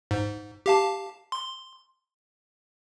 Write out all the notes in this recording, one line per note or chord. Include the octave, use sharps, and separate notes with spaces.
G#2
G4 F5 A5
C6